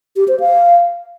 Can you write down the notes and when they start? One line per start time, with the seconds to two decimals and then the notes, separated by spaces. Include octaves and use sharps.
0.16 G4
0.28 C5
0.40 F5